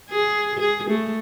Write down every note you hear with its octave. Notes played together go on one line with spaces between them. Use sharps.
G#4
G#4
A3